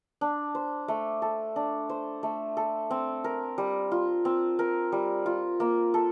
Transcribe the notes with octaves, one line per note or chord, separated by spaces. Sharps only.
D4
C5
A3
A4
D4
C5
A3
A4
C4
A#4
G3
F4
C4
A#4
G3
F4
A#3
A4